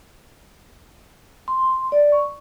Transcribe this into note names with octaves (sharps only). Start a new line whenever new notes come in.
C6
D5
C#6